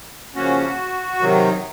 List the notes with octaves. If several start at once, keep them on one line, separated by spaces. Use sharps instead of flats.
C#3 F3 A#3 C#4 F#4
C3 D#3 F#3